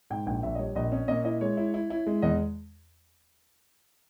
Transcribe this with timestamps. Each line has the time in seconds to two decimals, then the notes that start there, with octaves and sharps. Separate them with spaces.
0.10 G#2 G5
0.26 A#1 G5
0.43 A#1 E5
0.55 D#5
0.59 G3 C#5
0.75 A#1 D#5
0.92 C#4 D#5
1.08 A#2 D#5
1.24 E4 D#5
1.41 G#3 C#5
1.57 E4
1.74 E4
1.90 E4
2.07 G#3
2.22 E2 D#5